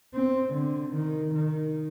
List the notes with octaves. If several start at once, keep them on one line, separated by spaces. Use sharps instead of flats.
C4
D3
D#3
D#3